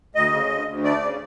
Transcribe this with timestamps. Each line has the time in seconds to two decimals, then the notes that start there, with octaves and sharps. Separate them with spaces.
0.15 D2 D#5
0.32 C#3
0.50 D2
0.67 D2
0.84 A3 D5
1.01 C#3